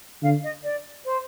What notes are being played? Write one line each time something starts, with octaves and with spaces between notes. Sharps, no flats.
D3 F5
D#5
D5
C5